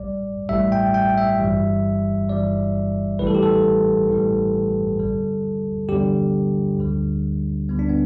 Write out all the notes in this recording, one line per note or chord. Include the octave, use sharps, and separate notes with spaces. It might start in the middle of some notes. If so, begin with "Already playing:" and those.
Already playing: A1 A2 G3 D5
A1 A2 G3 E5
G5
G5
E5
G1 G2 E3 G3
G1 G2 E3 G3 D5
A1 A2 E3 G3 B4
A4
G4
A4
A1 A2 E3 G3
E2 D3 G3
E2 D3 G3 G4
D2 D3 G3
D2 D3 G3 B3
D4
B3